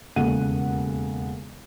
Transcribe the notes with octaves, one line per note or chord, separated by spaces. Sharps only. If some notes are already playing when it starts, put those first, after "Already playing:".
E1 D#2 C#3 A4 F#5 D#7